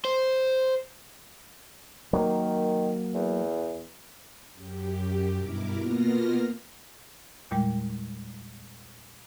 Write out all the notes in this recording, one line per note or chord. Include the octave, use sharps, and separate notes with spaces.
C5
D#3 F#3 A#3
E2
F#2 G4
G2 B2 E4 A#4 D6
B2 A#3 B3 F4 F6 A#6
E2 A#2 G3 G#3 G5